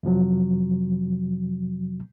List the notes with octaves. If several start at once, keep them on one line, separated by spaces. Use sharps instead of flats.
F2 C3 F3 F#3